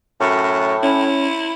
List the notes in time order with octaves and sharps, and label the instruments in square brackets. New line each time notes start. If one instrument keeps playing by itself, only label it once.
[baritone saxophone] F#2 [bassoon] A2 [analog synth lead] C#6
[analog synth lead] C#4 [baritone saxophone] E4